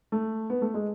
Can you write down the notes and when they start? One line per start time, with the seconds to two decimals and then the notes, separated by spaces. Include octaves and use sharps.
0.12 A3
0.50 B3
0.62 A3
0.74 G#3